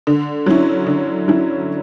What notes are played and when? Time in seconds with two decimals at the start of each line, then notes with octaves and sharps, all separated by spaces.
0.07 D3
0.46 F#3 C#4 E4
0.86 D3
1.28 F#3 C#4 E4